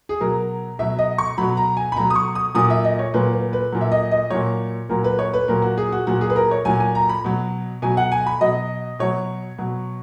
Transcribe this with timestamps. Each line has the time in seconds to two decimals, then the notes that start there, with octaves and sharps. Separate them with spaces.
0.09 G#4
0.21 B2 F#3 A#4
0.79 B2 F#3 E5
0.99 D#5
1.18 C#6
1.38 B2 F#3 B5
1.57 A#5
1.77 G#5
1.92 B5
1.96 B2 F#3 A#5
2.10 D#6
2.16 C#6
2.35 D#6
2.54 A#2 F#3 D#6
2.70 E5
2.85 D#5
2.99 C#5
3.14 A#2 F#3 B4
3.33 B4
3.53 B4
3.72 A#2 F#3
3.81 E5
3.92 D#5
4.11 D#5
4.30 A#2 F#3 C#5
4.89 A#2 F#3 A#4
5.04 B4
5.19 C#5
5.34 B4
5.48 A#2 F#3 A#4
5.62 F#4
5.78 G#4
5.92 F#4
6.07 A#2 F#3 F#4
6.21 G#4
6.30 B4
6.36 A#4
6.51 C#5
6.65 A#2 F#3 G#5
6.80 G#5
6.95 A#5
7.09 B5
7.24 B2 F#3
7.82 B2 F#3 G#5
7.97 F#5
8.12 G#5
8.27 B5
8.41 B2 F#3 D#5
8.99 B2 F#3 C#5
9.59 B2 F#3